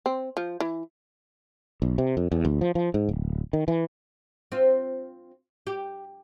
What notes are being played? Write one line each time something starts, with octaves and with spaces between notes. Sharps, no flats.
C4
F3
E3
B1
C3
F2
E2
D2
F3
F3
G#2
D1
D#3
E3
C4 F4
G4